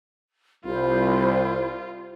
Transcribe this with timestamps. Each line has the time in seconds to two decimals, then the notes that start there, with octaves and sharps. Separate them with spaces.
0.65 C2 G3 F4 C5 B5